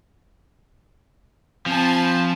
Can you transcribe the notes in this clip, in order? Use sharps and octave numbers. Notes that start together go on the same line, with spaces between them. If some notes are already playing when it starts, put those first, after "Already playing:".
F3 C4 G#5 A5 B5